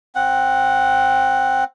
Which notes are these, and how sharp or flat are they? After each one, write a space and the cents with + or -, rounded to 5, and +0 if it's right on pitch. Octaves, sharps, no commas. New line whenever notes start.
C4 +15 F#5 +0